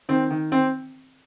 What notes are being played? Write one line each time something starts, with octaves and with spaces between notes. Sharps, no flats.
D#3 C4
D#3
C4